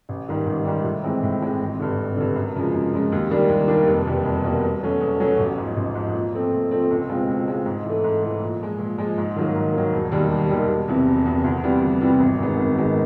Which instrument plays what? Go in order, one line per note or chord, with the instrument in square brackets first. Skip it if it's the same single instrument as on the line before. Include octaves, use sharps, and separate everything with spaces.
[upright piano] A1
G#2 D#3 G3
A1
G#2 D#3 G3
A2
E3 G#3 C4
A2
E3 G#3 C4
G#1
G2 D3
G#1
G2 D3
F#2
C#3 F3 G#3
F#2
C#3 F3 G#3
D#2
D#3 G3 A#3 D4
D#2
D#3 G3 A#3 D4
F1
E2 B2 G3 A#3
F1
E2 B2 G3 A#3
E2
B2 F#3 A3 C#4
E2
B2 F#3 A3 C#4
A1
G#2 F3
A1
G#2 F3
A#2
F3 A3 C4
A#2
F3 A3 C4
C#2
B2 G#3 C4 F4
C#2
B2 G#3 C4 F4
G#2
E3 A3
G#2
E3 A3
A#2
F3 G#3
A#2
F3 G#3
G#2
D#3 F#3 A#3
G#2
D#3 F#3 A#3
E1
D#2 D#3 G3
E1
D#2 D#3 G3
E1
E2 C3 E3
E1
E2 C3 E3
D2
C3 E3 G3 B3
D2
C3 E3 G3 B3
G#1
F#2 D#3 G#3 B3
G#1
F#2 D#3 G#3 B3